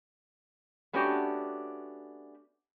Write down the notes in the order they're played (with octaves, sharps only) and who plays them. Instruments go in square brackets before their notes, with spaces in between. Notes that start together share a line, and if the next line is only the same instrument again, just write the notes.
[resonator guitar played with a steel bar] A3 B3 C#4 D4 F#4 G4